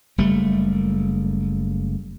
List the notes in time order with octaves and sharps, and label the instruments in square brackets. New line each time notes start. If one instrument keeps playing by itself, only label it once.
[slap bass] F#1 G3 A3